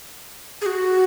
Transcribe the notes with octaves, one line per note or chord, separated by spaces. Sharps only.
G#4
F#4